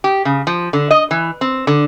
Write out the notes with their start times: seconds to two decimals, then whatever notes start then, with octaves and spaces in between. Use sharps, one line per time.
0.04 G4
0.25 C#3
0.47 F3
0.73 D3
0.91 D#5
1.11 E3
1.41 C4
1.67 D3